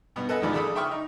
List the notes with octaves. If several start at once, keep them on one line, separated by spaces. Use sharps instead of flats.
G2 B2 B3
A4 B4 D#5 F#5 G#5
E2 G#2 D#3 F3 D4 B5
C#3 D4 A4 B5 D#6
E5 G5 B5 C#6 D#6 F6
D#4